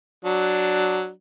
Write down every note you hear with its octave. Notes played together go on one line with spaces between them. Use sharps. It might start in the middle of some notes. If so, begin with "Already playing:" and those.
F#3 D4